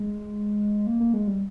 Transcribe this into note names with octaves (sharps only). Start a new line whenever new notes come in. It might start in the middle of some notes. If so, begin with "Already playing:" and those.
Already playing: G#3
A#3
A#3
G#3
G3